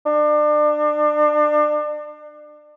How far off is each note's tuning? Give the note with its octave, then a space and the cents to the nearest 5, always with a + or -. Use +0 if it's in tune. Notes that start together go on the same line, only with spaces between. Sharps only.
D4 +30